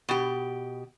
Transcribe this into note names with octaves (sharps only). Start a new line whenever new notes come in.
B2 G4